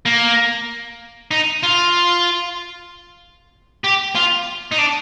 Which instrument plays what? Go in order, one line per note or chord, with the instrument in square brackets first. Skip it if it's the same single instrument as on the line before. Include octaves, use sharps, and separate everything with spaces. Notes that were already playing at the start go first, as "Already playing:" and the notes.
[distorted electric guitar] A#3
D#4
F4
G4
F4
D#4
D4